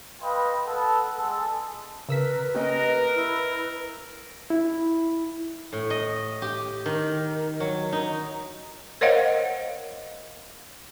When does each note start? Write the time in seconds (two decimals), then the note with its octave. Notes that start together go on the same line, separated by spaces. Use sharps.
0.22 B4 D#5 F5 G5 B5 C6
0.66 A4 B4 F#5
1.17 G#3 A4
2.09 C#3 A#4 B4 E6 B6
2.55 A#3 C#4 G4 A#4 D#5
3.14 E4
4.50 E4
5.73 A2
5.90 D#5
6.42 G4
6.86 D#3
7.60 F#3
7.92 D#4
9.01 A#4 C5 C#5 D#5 F5 F#5